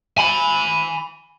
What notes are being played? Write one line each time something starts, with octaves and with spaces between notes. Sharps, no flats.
G#5 B5